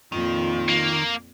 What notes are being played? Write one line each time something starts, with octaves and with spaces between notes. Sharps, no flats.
F2 A#2 D#3 F4
A#3